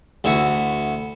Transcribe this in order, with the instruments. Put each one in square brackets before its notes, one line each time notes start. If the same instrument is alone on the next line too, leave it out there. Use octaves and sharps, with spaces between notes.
[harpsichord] D2 E4 F#4